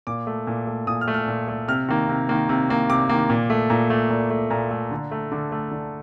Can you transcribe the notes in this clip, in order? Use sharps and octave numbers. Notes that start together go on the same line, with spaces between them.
A#2 D6
A3
A#2
A3
A#2 D#6
F6
A3
F6
A#2
A3
C3 F6
D#3 A#3
C3
D#3 A#3
C3
D#3 A#3
C3 D6
D#3 A#3
A#2
A3
A#2 A#5
A3
A#2
A3
A#2 A#5
A3
D3
A3
D3 D6
A3
D3